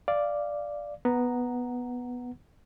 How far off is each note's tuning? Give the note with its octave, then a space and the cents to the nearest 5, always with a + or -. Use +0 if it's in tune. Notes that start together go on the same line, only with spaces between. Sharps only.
D5 +0 F5 -10
B3 +0 F#5 +0 A#5 +0